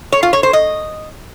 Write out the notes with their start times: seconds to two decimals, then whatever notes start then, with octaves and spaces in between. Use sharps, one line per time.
0.12 C#5
0.23 F4
0.33 C#5
0.43 C5
0.53 D#5